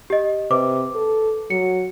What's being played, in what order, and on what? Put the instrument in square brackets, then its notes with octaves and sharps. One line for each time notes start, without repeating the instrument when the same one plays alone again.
[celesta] G4 D#5
[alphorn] C3 [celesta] B4 D6
[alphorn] A4
[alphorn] F#3 [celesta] C#7